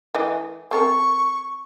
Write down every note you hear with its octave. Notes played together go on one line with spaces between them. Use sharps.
E3 A3 D#5
C4 A4 A#4 C#6